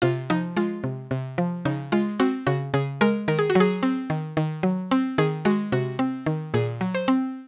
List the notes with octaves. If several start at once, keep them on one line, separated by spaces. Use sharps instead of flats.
C3 F4
F3 D#4
G#3 F4
C3
C3
F3
C#3 D#4
G#3 F4
C4 F#4
C#3 F#4
C#3 G#4
G#3 A#4
D#3 A#4
G#4
F#4
F#3 G#4
C4
D#3
D#3
F#3
C4
D#3 G#4
G#3 F#4
C3 F#4
C4
D#3
A#2 G#4
F#3
C5
C4